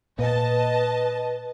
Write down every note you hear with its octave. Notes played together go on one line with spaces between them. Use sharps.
A#2 B4 D#5 A5